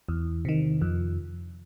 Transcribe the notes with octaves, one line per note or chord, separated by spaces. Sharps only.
E2
C3 D#3
F2